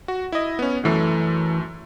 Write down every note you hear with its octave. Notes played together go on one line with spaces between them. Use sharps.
F#4
E4 D#5
B3 C#4
F#2 E3 A3